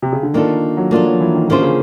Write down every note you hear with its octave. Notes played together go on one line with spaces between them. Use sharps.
C3
C#3
D3
D#3 A#3 D4 F4 A4
F#3
F3 A#3 D4 F4 A4
F#3
E3
D#3
D3 A#3 C#4 F4 G#4 C5
C#3